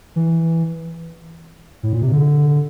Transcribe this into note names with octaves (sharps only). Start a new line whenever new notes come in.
E3
A2
A#2
C3
D3